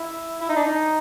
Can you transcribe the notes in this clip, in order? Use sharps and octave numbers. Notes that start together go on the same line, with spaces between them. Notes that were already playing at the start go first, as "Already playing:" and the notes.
Already playing: E4
E4
D#4
D4
D#4